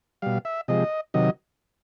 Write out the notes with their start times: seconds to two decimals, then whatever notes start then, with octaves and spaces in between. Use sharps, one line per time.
0.22 B2 G3 F5
0.45 E5
0.68 C3 F3 G#3 D#5
1.14 C3 D#3 F#3 D#5